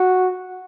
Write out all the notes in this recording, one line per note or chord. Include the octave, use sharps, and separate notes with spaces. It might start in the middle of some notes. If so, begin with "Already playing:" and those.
Already playing: F#4